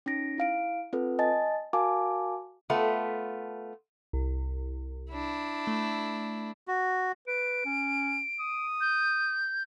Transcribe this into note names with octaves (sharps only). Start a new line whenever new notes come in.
C#4 D#4 A#6 D7
E4 F5 D7
C4 F4 A4 B4
D#5 G#5 A5 A6
F#4 A#4 F5 G#5 A5 D6
A3 B3 F4
C2
D4 E4
A3
F#4
B4 D7
C#4
D#6
G6